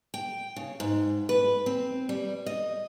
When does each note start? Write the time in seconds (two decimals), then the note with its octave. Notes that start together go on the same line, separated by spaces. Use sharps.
0.14 G5
0.56 C#3
0.80 G#2
1.29 B4
1.66 C4
2.09 G3
2.46 D#5